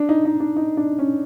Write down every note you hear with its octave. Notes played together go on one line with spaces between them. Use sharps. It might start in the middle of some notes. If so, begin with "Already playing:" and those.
Already playing: D4
D#4
D#4
D4
D#4
D4
C#4